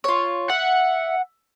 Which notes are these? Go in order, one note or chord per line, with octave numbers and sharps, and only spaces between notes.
F4 C#5
E5 F#5